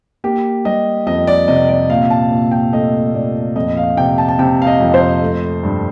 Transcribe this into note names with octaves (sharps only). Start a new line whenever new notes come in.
A#3 G4
G3 D#5
F2 D#5
D5
C3 D#5
D5
A#2 F5
A5
A#2
G5
A3 D#5
A#2 D5
F2 D#5
F5
C3 G5
A5
A5
C3 G5
F5
D#5
F2
C5
A3
G2